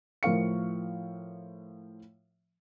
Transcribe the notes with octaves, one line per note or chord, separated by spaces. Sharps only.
A2 F3 A#4 F5 C#6 C#7